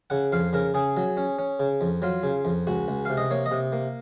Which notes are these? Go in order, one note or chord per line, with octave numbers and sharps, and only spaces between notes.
C#3 F#5
F2 F5
C#3 A#4
C#3 G#4
F#3
C#4
C#4
C#3
F2
F#3 F4
C#3
F2
C#2 F#4
C#2
C3 F5
D#5
A#3 C#5
D#5
C3
A#3